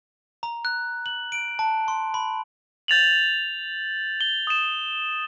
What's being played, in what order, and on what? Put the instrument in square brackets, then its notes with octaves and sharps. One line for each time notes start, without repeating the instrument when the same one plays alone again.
[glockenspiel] A#5
F#6
F#7
D7
A5
C6
B5
[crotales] G6 A6 F7 F#7
G7
D#6 E7